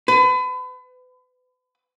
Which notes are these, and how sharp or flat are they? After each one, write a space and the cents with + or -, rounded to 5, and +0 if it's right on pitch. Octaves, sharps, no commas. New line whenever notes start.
B4 +35